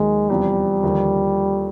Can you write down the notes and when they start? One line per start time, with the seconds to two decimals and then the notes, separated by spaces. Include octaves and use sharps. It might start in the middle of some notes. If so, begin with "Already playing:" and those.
Already playing: D#2 D#3 F#3 G#3
0.29 E2 C3 F3 G3
0.83 D#2 D3 F3